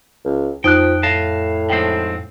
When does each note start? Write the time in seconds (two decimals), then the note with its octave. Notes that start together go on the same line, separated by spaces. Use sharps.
0.25 C#2
0.64 F2 F3 D#4 G5 D#6 F#6
1.03 A2 F5 A5 A#6
1.70 G#2 F3 C4 G5 C7